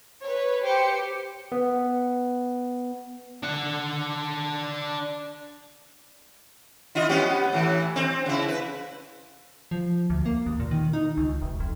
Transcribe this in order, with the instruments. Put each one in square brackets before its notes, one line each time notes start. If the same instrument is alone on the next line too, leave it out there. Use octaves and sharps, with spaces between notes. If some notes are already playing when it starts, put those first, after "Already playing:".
[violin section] B4 C#5
G4 C5 C#7
[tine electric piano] B3
[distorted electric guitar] D4 F#5
[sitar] E4 F4 D#5
B3 C#4 G4
A2 E3
C4
C#3 E4
B4
[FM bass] F3
D2
A#3
D#2
A#2
D#3
D#4
C#2
E1
F2